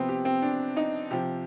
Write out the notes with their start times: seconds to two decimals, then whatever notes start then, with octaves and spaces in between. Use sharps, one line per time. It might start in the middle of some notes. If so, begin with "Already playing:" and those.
Already playing: C3 F3 B3 C4
0.09 G4
0.25 C4
0.42 D4
0.76 D#4
1.11 C3 F3 G4